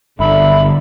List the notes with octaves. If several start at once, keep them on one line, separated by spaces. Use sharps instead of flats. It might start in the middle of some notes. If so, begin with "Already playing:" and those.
G1 D3 E5 B5